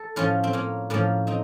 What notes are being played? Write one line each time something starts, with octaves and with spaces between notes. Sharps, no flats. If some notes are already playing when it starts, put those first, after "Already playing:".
Already playing: A4
A2 F3 C#4 F4
C4
A#3 C#4
A2 F3 A#3 C#4
C4 D#4